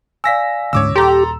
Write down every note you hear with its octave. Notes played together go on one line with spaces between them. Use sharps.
D5 F5 G#5 E6 A#6 B6
D2 G#2 C#4 C#5 D6 E6
D#1 G4 A4 A#5 C6